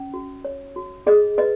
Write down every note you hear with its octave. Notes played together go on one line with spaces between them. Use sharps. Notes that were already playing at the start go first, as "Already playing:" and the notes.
Already playing: C#4
F#4
C#5
F#4
G#4 D#5
B4 D#5